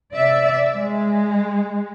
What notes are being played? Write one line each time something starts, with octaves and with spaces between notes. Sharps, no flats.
C3 D5 E5
G#3